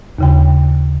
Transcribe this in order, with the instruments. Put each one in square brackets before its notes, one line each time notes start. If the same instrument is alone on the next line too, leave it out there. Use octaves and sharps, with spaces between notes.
[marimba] D#2 C#3 G5